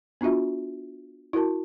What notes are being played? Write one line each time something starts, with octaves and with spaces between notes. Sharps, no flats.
B3 D4 F4 F#4 E5
E4 F#4 A#4 A5